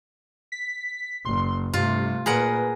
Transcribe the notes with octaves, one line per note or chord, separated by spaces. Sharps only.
B6
F#1 C6
G2 C3 A3 F4
A#2 G#4 A#4 B4 F#5